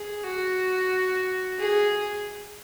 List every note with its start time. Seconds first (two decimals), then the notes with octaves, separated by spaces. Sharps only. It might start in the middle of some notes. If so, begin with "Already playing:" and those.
Already playing: G#4
0.24 F#4
1.59 G#4